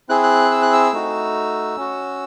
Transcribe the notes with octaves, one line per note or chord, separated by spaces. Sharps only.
C4 E4 G#4 F#6
F#6
E6
F#6
E6
A3 D#4 F#4
C#4 F#4